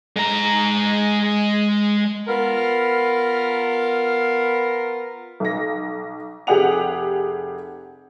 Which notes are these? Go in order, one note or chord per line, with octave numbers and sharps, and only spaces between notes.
G#3 A#5
B3 F4 A#4
B1 A#6
F1 G4 G#4 F#5 F7